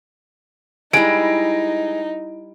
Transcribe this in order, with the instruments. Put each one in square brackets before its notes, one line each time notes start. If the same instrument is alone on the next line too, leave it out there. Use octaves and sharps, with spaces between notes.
[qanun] G3 E4 [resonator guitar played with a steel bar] G#3 [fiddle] D#4 [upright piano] D7